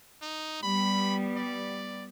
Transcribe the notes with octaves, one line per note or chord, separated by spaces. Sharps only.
D#4
G3 B3 B5
D5